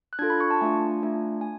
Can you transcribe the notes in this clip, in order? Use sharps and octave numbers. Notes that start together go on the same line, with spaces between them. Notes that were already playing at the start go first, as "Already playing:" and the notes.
F#6
D4 F4 A4 G#6
B5
C#6
A5
A3 D4 F4 G#5
A3 D4 F4
G#5